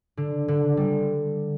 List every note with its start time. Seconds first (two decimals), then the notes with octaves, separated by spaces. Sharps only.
0.17 D3
0.48 D3
0.77 G3